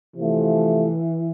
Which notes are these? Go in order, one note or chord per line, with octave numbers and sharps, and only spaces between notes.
C3 E3 F3 A3